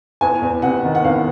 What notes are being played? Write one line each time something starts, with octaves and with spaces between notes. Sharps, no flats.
E2 G#5
E2
C3 F#5
D#3
F#5
E2 F5